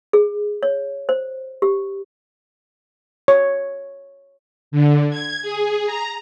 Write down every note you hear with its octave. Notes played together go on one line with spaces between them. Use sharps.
G#4
C#5
C5
G4
C#5
D3
G#6
G#4
A#5